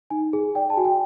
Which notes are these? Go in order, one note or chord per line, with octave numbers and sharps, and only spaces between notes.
D#4 G#5
G#4
D5 G5
A5
F#4 G#5
G5